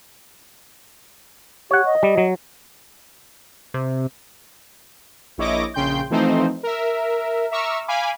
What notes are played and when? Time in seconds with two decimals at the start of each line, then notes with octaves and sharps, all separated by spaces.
1.71 G4 C#5 F#5
1.85 D#5
2.03 G3
2.18 F#3
3.74 C3
5.38 A#1 E4 C#5 D#5 D6 A#6
5.74 A#1 C#3 G5 C6 G6
6.10 E3 F3 A3 C4 D#4 C5
6.63 A#4 E5
7.51 E5 A#5 C#6 D6 E6 F6
7.88 F5 G#5 B5 D6